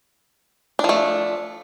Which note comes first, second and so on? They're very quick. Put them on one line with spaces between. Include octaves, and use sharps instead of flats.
D4 F3 A3